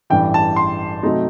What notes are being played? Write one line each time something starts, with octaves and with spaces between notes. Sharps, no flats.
A1 G2 E3 G5
A5
C6
C3 F#3 A3 D#4